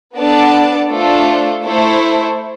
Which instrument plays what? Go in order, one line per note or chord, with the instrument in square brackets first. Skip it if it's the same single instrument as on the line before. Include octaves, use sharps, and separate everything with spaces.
[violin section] B3 D4 A4 D5 A5
A3 D4 F4 A4 C5
A3 E4 A4 C5